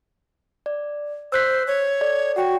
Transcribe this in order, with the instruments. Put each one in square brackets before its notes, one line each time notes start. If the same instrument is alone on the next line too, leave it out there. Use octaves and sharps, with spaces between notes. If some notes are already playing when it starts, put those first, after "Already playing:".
[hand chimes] D5
[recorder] C5 [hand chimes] E6 F#6 B6
[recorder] C#5
[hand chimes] A4 D5
[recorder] F#4 [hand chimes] F#5 G5